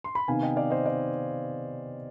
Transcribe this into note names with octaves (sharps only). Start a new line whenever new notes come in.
C6
B5
C3 D#3 B3 D#4 F5 G#5
D#5 G5
D5 F5
C5 D#5
D5 F5